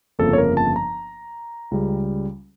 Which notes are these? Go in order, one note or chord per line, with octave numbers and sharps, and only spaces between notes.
G1 F2 C#3 F3 A#3 A4
C#5
A#4
A5
A#5
C#2 C#3 G3